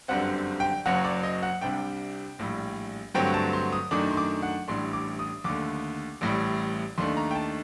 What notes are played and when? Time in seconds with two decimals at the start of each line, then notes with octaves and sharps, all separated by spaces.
0.08 G1 F#2 D3 G3 C4 F#5
0.60 G5
0.86 F#1 F#2 F#3 F#5
1.05 D5
1.23 D#5
1.43 F#5
1.61 C2 C3 G3 D4 G5
2.39 A#1 A2 G3
3.14 G2 D3 F#3 A3 C4 G5
3.34 A5
3.53 C6
3.73 D#6
3.91 F#2 D#3 A3 D4 D6
4.11 C6
4.17 D6
4.43 F#5
4.68 A1 A2 G3 D4 C6
4.93 D6
5.19 D#6
5.44 D#2 D3 A3 D6
6.21 A1 A2 G3
6.98 D#2 D#3 A3 D4 C6
7.17 A#5
7.31 G5
7.35 A5